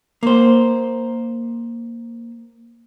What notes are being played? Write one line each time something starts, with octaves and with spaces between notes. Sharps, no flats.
A#3 C5